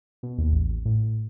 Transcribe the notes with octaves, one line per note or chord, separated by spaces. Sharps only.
B2
D#2
A1
A2